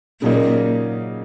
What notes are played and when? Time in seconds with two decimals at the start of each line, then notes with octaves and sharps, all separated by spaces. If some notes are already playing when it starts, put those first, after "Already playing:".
0.22 A#2 C#3 F#3 A#3 D#4